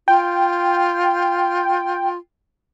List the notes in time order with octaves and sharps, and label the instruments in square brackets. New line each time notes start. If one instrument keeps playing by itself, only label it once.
[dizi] F4 [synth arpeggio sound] G5